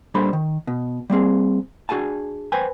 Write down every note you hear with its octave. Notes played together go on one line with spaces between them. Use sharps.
A#2 G3 D4 A4 C5 B5
D#3
B2
G3 A#3 C4 G#4
D4 F#4 G#4 G#5 A5
B4 C5 G5 G#5